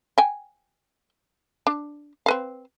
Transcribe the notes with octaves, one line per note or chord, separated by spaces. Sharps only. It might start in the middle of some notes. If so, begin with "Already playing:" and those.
G5 G#5
D4
C4 B4 F5